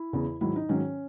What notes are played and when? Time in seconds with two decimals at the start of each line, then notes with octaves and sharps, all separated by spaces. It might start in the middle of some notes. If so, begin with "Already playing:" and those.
Already playing: E4
0.13 E2 C#3 E3
0.41 G#2 D#3 F#3 E4
0.56 D#4
0.69 G#2 D#3 F#3 C#4